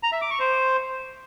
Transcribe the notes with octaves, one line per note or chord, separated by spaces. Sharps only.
A#5
E5
D6
C#6
C5